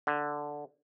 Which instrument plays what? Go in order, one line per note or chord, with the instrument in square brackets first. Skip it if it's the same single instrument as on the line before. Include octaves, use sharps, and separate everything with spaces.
[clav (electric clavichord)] D3